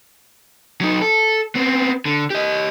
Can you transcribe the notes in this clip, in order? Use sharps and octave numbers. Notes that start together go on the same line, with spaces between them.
F#3 D#4
A4
B3 C4
D3
G4 D#5